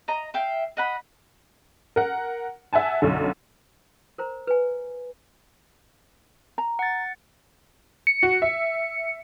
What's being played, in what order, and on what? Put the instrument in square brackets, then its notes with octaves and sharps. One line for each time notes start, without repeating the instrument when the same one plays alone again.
[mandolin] D#5 A#5
E5 F5 G5
D#5 F#5 B5
[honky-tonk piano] A#4 F#5
E5 F#5 G#5 A5
B1 F#2 D3
[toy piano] A#4 C5 A#5
B4 G#5
[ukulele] A#5
[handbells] F#5 A6
[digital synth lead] C#7
[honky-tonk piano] F#4
E5